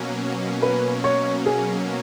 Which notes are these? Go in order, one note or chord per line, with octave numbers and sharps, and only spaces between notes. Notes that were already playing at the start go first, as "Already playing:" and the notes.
Already playing: B2 F#3 A#3 C#4
B4
C#5
G#4